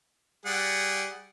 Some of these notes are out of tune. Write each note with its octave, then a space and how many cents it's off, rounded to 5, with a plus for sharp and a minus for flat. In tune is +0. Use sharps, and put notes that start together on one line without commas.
G3 -10 G#4 -15 F#5 +5